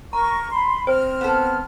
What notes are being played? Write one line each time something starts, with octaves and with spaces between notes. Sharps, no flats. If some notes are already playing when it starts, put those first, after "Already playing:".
A#4 A#5 C#6
B5 C6
C4 C5 F6
B3 A4